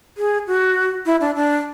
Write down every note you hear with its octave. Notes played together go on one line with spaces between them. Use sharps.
G#4
F#4
E4
D4
D4